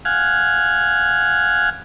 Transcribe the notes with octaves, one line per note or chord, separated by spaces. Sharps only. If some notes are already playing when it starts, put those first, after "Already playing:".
F5 F#5 G#5